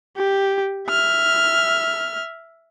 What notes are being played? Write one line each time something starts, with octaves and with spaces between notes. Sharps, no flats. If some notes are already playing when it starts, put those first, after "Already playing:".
G4
E5 F6